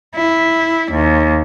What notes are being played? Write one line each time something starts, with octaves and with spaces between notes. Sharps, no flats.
E4
D#2